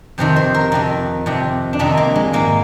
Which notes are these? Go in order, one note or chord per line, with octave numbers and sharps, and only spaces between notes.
F2 C3 D#3 C5
C5
A#4
F2 C3 D#3
F2 C3 D#3
D4
F2 C3 D#3 D#4
A#3
G#3
G#2 D#3 A#3